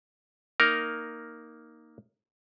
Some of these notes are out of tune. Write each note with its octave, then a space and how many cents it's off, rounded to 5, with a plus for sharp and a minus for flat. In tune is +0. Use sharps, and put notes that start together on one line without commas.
A#3 +0 D#4 +0 A#4 +0